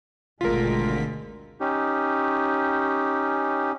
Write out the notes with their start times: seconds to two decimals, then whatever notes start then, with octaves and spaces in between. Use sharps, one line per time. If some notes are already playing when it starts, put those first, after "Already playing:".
0.41 G#1 D2 B2 D3 G#3 F4 A#4 B6
1.60 C#4 D#4 G4